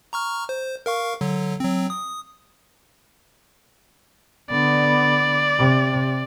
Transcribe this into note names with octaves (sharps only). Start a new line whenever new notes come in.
A#5 C#6 F6
C5
A#4 F5 C#6
D3 F#3
F#3 C4
D#6
D3 B3 D5
C3